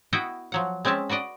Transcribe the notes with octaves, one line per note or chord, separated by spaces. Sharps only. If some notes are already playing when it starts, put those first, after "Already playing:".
B3 E4 F#4 D#5 F#5 G5
F3 F#3 F#5
G#3 C4 C#4 E5 A5
F#4 B4 D5 D#5